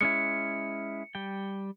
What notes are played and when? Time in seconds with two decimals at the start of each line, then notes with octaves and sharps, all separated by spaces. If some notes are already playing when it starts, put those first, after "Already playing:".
0.01 G#3 C#4 E4 C#7
1.15 G3 G5